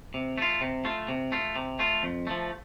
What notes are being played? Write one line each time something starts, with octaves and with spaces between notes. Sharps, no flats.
C3
A3 F4
C3
A3 F4
C3
A3 F4
C3
A3 F4
F2
F3 A3